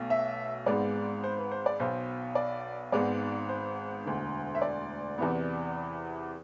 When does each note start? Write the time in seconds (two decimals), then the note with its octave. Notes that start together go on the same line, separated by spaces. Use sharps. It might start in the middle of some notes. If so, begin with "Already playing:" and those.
Already playing: B1 B2 A3
0.10 E5
0.66 G#1 G#2 G#3 B3 D5
1.24 C5
1.38 B4
1.51 C5
1.66 D5
1.80 B1 B2 B3 C5
2.35 D5
2.92 G#1 G#2 G#3 B3 D5
3.49 C5
4.05 E1 D2 D3
4.55 E5
4.62 D5
5.18 E2 C3 E3 B3